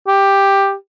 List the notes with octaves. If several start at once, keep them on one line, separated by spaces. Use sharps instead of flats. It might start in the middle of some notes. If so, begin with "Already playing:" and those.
G4